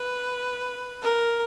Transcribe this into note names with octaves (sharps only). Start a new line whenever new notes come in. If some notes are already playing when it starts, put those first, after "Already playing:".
Already playing: B4
A#4